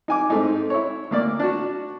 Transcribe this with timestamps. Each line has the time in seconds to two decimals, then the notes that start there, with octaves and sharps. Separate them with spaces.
0.08 D#4 G#5 D6
0.30 G#2 A3 C4 D#4
0.70 E4 C#5
1.11 D2 A#3 D5
1.39 D4 F#4